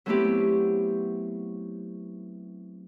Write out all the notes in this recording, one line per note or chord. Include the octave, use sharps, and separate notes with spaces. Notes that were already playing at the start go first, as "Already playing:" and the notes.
F#3 A3 B3 C4 E4 G4